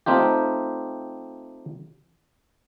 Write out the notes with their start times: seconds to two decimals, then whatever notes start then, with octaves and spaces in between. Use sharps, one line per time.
0.06 A3 C4 D#4 F4 G4